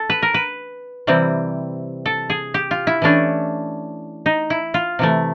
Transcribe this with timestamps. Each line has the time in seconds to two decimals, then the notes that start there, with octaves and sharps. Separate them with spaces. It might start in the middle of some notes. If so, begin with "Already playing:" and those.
Already playing: A4
0.10 B4
0.22 A#4
0.34 B4
1.07 C3 E3 G3 C4
2.06 A4
2.30 G#4
2.54 G4
2.71 F4
2.87 E4
3.02 E3 A3 C#4 D4
4.26 D#4
4.50 E4
4.74 F4
4.99 C3 E3 A3